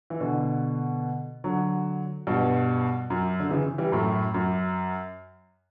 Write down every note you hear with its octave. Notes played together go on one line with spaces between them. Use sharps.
E3
B2 D3
D3 F#3
G2 B2
F#2
D3
C#3 E3
E3 G3
F#2 A2
F#2